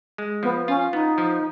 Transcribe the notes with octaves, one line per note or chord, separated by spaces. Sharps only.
G#3
F3 B3
C#4 F4
B3 D#4
F3